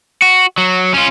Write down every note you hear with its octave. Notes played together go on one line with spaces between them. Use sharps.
F#4
F#3
C#4 F4